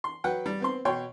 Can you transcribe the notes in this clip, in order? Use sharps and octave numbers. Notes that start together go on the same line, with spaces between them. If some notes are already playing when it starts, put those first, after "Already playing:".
C6
F#3 B4 F#5 G5
G3
B3 C4 C6
B2 C#5 G5 C6